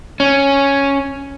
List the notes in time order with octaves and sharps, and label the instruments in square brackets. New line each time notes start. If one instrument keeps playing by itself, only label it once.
[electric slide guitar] C#4